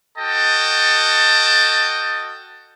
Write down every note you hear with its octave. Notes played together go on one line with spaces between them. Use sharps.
F#4 A4 D#5 G5 A5